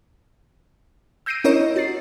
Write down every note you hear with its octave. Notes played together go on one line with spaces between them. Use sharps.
E6 G6 A#6 C7 D7 D#7
C#4 D4 E4 A#4 C#5 D#5
F#4 A6 C7